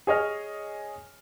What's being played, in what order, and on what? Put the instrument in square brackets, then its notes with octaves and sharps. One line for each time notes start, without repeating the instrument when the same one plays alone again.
[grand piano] G#4 C#5 D#5 F6